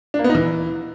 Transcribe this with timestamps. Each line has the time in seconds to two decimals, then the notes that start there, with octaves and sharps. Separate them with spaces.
0.14 D4
0.19 A#3
0.24 B3
0.30 D#4
0.35 E3